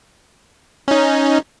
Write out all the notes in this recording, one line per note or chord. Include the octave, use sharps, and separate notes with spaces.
C#4 D#4